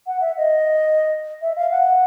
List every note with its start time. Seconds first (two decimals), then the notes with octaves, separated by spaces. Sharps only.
0.07 F#5
0.21 E5
0.37 D#5
1.42 E5
1.57 F5
1.71 F#5